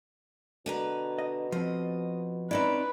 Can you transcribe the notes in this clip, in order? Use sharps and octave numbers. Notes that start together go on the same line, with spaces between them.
B2 D3 B4 A#5
D#5
F3 C4 D#5
C4 C#4 D#4 E4 B4 D5